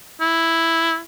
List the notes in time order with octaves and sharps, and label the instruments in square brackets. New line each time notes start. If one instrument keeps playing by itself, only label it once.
[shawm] E4